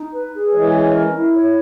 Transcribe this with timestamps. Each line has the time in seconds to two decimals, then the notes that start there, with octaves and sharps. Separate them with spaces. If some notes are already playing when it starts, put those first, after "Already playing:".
Already playing: D#4
0.12 B4
0.33 G#4
0.53 E3 G#3 C#5
0.74 C#4
0.94 A#4
1.15 E4
1.35 C#5